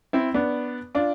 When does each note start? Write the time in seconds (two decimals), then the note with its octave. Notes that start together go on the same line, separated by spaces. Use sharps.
0.13 C4 E4
0.34 B3 D4
0.95 D4 F4